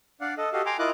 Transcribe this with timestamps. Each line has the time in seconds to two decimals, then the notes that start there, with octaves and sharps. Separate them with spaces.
0.21 D4 D5 F5 F#5
0.38 A4 D#5
0.53 F#4 G4 A4 D#5 F5
0.66 G5 G#5 A#5 C6 D6
0.79 E4 F4 A#4 D#5 D6 F#6